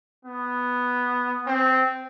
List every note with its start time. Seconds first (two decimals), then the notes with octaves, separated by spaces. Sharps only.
0.25 B3
1.46 C4